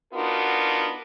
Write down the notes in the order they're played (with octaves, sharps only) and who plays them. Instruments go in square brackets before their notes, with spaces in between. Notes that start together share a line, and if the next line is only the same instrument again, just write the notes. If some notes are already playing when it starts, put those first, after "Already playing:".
[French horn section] B3 D4 D#4 F4 F#4 A#4